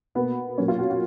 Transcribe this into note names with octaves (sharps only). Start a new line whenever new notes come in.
B2 A#3 B3
A#2 F#3 A#3 C#4
F4
F#4
F#4